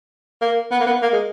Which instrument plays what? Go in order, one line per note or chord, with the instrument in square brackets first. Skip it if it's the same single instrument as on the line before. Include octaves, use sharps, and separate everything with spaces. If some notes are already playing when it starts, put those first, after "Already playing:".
[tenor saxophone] A#3
B3
A#3
B3
A#3
G#3